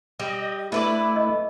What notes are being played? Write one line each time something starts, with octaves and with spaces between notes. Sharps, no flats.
G3 D#5
A3 D4 E4 B4 D5
D#5